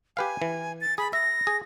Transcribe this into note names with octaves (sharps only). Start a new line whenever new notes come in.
G4 B4 F5 G#5
E3
A6
G#4 B5
E5 A#6
G#4